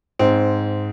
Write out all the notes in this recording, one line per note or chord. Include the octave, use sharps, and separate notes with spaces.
G#2 C4